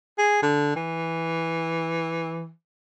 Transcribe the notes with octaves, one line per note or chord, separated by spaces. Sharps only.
G#4
D3
E3